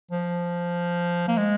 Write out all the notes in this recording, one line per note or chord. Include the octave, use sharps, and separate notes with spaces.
F3
A#3
G#3